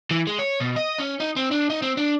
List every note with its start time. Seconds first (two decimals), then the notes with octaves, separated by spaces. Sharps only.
0.11 E3
0.27 G#3
0.39 C#5
0.60 B2
0.77 D#5
0.99 C#4
1.20 D#4
1.36 C4
1.51 D4
1.70 D#4
1.82 C4
1.97 D4